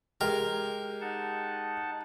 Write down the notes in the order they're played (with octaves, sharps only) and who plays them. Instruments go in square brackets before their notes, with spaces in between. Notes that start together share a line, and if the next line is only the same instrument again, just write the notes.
[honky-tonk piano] G#3 G4 [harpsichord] A#4
[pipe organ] D#4 F#5 A5